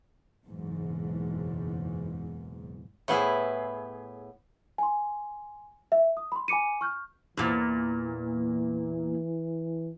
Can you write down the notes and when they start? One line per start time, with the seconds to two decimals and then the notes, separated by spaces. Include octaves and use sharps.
0.45 F#1 B1 E2 G#2
3.08 A2 B3 E4 G#4
4.78 G#5 C6
5.92 E5
6.17 D#6
6.32 B5 C6
6.48 G#5 B5 D6 C#7 D#7
6.81 C#6 F6 G6
7.37 E2 A#2 E3